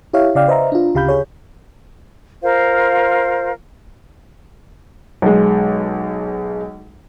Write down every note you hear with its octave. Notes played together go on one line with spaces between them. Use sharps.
E4 G4 C#5 E5 F5
C#3 D5 F5 G5
B4 C5 D#5 E5 A#5
D4 F4
D2 C#3 G4 F5 B5 G6
G#4 C#5
F4 A#4 C5 F5
B1 G#3